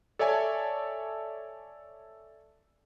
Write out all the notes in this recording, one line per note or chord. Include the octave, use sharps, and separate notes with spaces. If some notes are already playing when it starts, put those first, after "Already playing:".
A4 C#5 D5 E5 G#5 A5